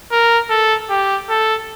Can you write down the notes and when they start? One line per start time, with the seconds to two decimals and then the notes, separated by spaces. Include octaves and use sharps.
0.12 A#4
0.50 A4
0.90 G4
1.30 A4